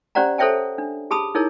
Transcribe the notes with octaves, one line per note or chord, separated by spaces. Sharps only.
C#4 G4 C5 D5 F#5 A#5
A4 C5 C#5 E5 G5 A5
D4
G4 G#4 A5 B5 D#6
D#4 E4 G#4 A#4 C#5